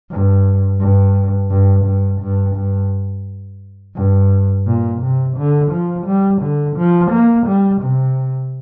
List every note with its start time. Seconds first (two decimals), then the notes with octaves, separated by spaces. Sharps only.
0.11 G2
0.80 G2
1.51 G2
1.85 G2
2.21 G2
2.56 G2
3.96 G2
4.67 A#2
5.02 C3
5.37 D3
5.72 F3
6.06 G3
6.42 D3
6.77 F3
7.12 A#3
7.47 G3
7.82 C3